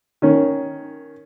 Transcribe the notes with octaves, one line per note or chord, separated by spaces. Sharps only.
D#3 C#4